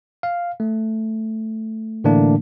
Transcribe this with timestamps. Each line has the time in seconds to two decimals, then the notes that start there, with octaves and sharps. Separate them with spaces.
0.23 F5
0.60 A3
2.04 A2 D3 E3 A3 A#3 D4